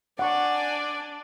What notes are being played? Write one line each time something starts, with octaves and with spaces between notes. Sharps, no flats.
D4 D5 F#5 G#5 C#6